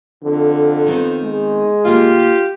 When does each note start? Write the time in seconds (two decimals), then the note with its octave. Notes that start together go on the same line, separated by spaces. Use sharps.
0.23 F2 D3
0.86 D#3 B3 C4
1.23 G#3
1.85 D2 A#3 F4 G4 G5